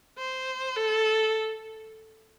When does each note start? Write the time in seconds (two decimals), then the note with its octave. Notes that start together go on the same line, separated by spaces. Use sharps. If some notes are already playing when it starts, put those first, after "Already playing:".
0.18 C5
0.76 A4